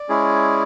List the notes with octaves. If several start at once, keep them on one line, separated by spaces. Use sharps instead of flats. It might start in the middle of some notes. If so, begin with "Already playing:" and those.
Already playing: D5
G#3 C#4 E4 G#4